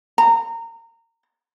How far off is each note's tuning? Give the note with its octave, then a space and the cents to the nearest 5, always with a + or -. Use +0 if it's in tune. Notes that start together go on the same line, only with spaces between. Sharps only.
A#5 -25